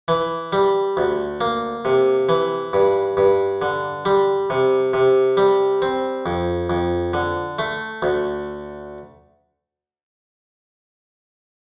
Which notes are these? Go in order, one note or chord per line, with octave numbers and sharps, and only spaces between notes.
E3
G3
D2
A#3
C3
E3
G2
G2
D3
G3
C3
C3
G3
C4
F2
F2
D3
A3
D2